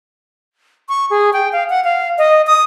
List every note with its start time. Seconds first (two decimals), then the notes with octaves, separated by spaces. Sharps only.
0.89 C#6
1.10 G#4
1.33 G5
1.53 F5
1.70 F#5
1.84 F5
2.18 D#5
2.47 D#6